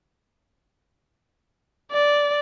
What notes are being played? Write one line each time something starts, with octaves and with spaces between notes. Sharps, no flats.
D5